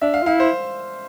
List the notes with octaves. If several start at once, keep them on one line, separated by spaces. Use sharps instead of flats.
D4 E5
F5
F4
E4 F5
C5